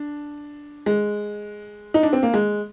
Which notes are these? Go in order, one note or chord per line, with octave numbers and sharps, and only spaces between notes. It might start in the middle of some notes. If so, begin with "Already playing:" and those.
Already playing: D4
G#3
D#4
D4
C4
A#3
G#3